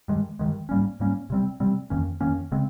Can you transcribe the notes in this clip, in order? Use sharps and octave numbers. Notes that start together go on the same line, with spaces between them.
G2 D#3 G#3
G2 D#3 G#3
G#2 G3 A#3 C#4
G#2 G3 A#3 C#4
C3 G3 C4
C3 G3 C4
F2 D#3 A#3 C#4
F2 D#3 A#3 C#4
C#3 G#3 C4